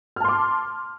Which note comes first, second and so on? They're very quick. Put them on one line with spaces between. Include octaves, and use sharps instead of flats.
F6 A5 C6 D6